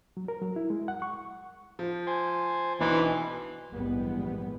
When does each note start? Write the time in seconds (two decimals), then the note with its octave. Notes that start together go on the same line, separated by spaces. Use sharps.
0.17 F#3
0.28 A#4
0.42 F#3
0.56 E4
0.70 G#3
0.88 F#5
1.02 C#6
1.79 F3
2.07 C5 G#5
2.80 B1 B2 E3 D4 C5
3.71 A#1 G#2 E3 G3 G#3 B3